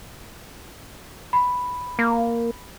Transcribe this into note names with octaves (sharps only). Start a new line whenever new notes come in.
B5
A#3